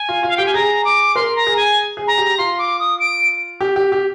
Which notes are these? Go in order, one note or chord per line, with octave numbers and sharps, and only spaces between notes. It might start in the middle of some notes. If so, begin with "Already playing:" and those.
Already playing: G#5
F4
F4
F5
G4 G5
G#5
G#4 A#5
D6
A#4 C6
A#5
G#4
G#5
G#4
A#5
G4
F4 C6
D6
D#6
D7
G4
G4
G4